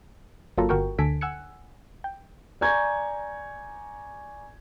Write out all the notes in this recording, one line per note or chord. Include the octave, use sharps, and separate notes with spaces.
G1 F#3 A#3 F4 A4 A#5
G1 F#4 A#4 G5 C#6
D2 D3 A4 G#5 B6 D7
F#5 G#5 E6 F#6 G#6 C#7
G5
D5 G#5 A#5 C#6 G6 G#6